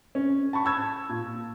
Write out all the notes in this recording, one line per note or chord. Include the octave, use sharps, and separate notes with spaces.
C#4
A5 B5 C#6
A5 E6 G#6
A#2